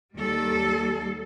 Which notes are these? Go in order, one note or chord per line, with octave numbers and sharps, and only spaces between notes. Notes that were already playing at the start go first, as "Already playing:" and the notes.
D#2 G3 A4